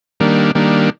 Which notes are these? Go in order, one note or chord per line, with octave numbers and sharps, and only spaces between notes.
D#3 G3 A#3 D4
D#3 G3 A#3 D4